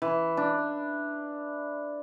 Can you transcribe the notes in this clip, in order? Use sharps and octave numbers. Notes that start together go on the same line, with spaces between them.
E3
D4